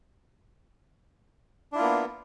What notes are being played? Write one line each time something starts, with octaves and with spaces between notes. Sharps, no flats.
A#3 B3 D4 E4 F4